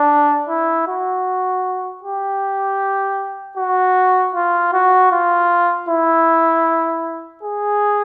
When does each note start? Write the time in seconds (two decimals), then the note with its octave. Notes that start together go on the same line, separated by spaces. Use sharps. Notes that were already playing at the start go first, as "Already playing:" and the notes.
Already playing: D4
0.49 E4
0.88 F#4
2.03 G4
3.57 F#4
4.35 F4
4.73 F#4
5.12 F4
5.89 E4
7.43 G#4